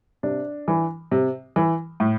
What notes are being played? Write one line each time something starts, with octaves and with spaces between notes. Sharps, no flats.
C3 D4
E3
C3
E3
A2